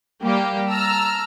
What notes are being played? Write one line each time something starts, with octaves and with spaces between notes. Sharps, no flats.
G3 A#3 G4
A5 A#5 E6 F6